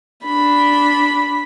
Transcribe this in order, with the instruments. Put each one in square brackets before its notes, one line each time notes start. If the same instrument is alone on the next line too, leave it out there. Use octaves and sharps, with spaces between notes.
[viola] D4 B5